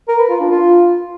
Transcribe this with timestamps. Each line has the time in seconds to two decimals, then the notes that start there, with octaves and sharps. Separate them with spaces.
0.08 A#4
0.19 B4
0.30 F4
0.40 D4
0.51 F4